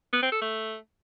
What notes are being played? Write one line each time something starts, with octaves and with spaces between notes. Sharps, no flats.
B3
C4
A4
A3